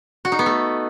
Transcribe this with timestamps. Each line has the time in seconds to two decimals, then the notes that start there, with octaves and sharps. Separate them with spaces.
0.25 F#4
0.32 D#4
0.39 B3
0.46 A3